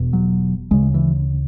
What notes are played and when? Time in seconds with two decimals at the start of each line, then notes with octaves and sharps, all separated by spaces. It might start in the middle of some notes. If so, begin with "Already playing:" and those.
Already playing: E1 E2 B2
0.13 F#3
0.71 D2 C#3 G#3
0.94 E3